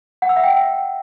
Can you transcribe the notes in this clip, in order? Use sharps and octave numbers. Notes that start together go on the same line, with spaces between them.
F#5
E6
E5
G5